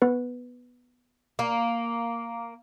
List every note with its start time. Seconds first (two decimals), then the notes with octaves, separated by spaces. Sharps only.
0.02 B3 B4
1.39 A#3